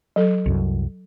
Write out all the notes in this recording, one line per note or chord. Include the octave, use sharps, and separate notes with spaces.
F#3 A4
C2 F#2